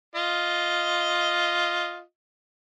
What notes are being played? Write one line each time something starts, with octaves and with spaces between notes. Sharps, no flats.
F4 D#5